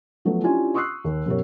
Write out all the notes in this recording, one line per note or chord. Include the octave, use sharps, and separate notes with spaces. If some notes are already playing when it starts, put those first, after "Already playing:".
F3 F#3 A3 B3
C#4 D4 E4 F4 G4 G#5
C6 C#6 D#6 E6 F#6 C7
D#2
F#2 B2 G4 A#4 C#5